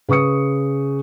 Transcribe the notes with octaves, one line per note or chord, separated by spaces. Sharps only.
C#3 B4 C#6 D#6 C#7